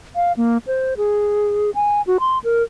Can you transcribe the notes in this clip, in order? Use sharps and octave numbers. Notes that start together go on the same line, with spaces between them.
F5
A#3
C5
G#4
G#5
F#4
C6
A#4